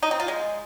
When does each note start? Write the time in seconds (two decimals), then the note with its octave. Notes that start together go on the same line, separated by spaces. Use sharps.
0.03 D#4
0.11 C4
0.20 F4
0.28 G#3